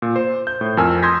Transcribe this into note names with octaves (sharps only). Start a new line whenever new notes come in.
A#2
C5
G6
A2
F2 A#4 G#5 E6 F6
C6 D#6 G6 G#6 A#6 B6